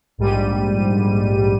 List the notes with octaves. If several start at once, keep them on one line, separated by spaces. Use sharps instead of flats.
A#1 G#2 G3 D#7